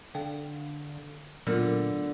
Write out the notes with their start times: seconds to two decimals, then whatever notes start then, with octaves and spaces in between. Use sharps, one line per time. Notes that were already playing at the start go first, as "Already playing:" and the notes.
0.15 D3 F5 G5
1.47 A#2 D3 F#3 A3 B3 F4 A#4